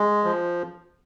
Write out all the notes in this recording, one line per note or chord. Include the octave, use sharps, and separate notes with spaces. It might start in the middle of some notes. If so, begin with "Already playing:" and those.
Already playing: G#3
F3